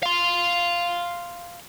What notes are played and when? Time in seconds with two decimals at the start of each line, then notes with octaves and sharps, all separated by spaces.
0.03 F5 C6